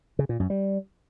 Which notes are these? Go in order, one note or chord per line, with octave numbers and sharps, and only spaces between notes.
C#3
A#2
F#2
G3